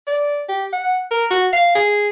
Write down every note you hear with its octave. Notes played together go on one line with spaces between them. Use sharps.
D5
G4
F#5
A#4
F#4
F5
G#4